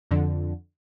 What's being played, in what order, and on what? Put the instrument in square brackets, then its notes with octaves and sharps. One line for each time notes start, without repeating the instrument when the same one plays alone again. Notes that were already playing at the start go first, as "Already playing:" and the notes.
[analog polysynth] F2 D3